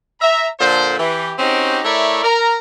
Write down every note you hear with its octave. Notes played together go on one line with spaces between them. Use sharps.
E5 A#5
A#2 D3 A4 C5
E3 G4
C4 C#4 D#4 F#4 G4
A3 E4 A#4 C#5 D5 E5
A#4 A#5